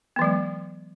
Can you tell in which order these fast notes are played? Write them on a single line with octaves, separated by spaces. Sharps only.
B3 E3 F#3 G#3